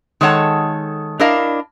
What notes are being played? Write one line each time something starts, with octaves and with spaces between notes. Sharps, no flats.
D#3 G#3 A4 C#5 F#5 A5
D4 E4 A#4 D#5 F5